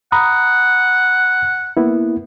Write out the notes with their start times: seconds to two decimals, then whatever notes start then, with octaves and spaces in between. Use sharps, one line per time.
0.12 F#5 A#5 B5 D#6
1.77 A#3 B3 E4